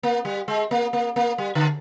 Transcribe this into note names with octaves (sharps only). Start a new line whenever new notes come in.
A#3
G3
G#3
A#3
A#3
A#3
G3
D3